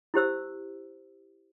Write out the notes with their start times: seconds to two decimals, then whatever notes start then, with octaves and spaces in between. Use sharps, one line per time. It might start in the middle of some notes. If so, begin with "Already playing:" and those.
0.14 E4 G4 C5 E6